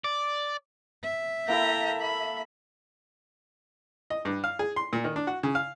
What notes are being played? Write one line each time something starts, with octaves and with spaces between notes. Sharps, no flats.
D5
E5
A#3 E4 A4 G5 A#5
B5
D#5
G2
F5
G#4
C6
A#2
D#3
D4
F#4
C#3
F5